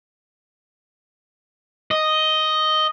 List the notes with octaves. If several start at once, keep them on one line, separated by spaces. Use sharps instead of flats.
D#5